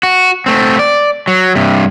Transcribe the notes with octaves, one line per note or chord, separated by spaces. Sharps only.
F#4
A3 C4
D5
F#3
G2 C3